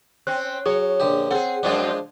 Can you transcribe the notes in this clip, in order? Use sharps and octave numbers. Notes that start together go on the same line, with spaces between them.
C4 C#4 F#6
F#3 G#4 C#5
A#1 D3 G4
C4 G#4 A4 F#5
F#2 F3 G#3 C4 D4 F4